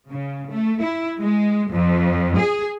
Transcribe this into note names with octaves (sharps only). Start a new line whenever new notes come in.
C#3
A3
E4
G#3
F2
G#4